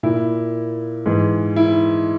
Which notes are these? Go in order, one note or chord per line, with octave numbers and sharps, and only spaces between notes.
A#2 E4
G#2 E3
E4